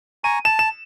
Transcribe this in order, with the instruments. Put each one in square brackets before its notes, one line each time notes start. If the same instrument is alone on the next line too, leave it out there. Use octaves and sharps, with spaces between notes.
[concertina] G#5 A#5 C#6 [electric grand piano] D#7
[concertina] A5 [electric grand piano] E7
[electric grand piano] E7